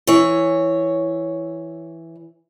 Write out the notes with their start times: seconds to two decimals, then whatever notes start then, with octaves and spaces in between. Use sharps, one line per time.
0.07 E3 C#5